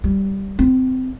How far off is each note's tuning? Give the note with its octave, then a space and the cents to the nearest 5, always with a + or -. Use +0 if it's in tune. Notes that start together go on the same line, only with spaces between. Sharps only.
G3 -5
C4 -25